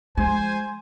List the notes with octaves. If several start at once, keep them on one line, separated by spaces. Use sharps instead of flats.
F3 G#3 C5 G#5